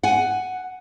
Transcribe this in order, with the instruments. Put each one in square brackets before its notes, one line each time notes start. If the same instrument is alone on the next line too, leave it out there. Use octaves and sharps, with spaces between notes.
[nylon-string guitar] F#5 G#5